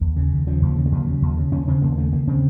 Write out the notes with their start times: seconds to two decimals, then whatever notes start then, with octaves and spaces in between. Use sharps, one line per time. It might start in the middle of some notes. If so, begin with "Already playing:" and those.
0.01 D#2
0.16 C#3
0.32 D#2
0.47 C#3 F3
0.62 D#2
0.76 C#3
0.86 A3
0.92 D#2 F#3
1.07 C#3
1.22 D#2
1.37 C#3
1.52 D#2 C#4
1.67 C#3 C4
1.82 D#2 A#3
1.92 A#3
1.97 C#3 A3
2.12 D#2 A#3
2.27 C#3 C4